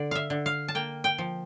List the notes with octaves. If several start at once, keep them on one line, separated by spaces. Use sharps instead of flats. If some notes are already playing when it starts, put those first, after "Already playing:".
Already playing: D3 D5
E5 F5
D3
F5
A5
A#3 G5
G5
F3